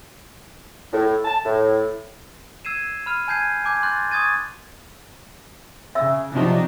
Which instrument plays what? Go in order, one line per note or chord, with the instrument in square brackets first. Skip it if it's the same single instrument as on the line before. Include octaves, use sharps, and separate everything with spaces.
[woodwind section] A2
A5
A2
[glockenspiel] E6 G#6 C7 D#7 E7
B5 F6 D#7
G#5 A5 G6 G#6 C7 D#7
G#5 A5 D6 G6 G#6
C6 F#6 G6 A6
C#6 D#6 G#6 A6 D#7
[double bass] C#3 [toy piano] E5 E6
[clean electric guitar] C3 F3 F#3 [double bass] D4 D#4